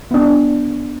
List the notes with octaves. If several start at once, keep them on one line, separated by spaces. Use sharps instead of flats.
B3 D4